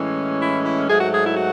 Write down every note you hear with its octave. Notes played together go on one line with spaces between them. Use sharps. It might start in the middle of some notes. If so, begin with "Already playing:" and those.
Already playing: A2 E3 G#3 C#4
E4
E4
G#2 F#3 A3 G#4
F#4
G#4
E4
F#4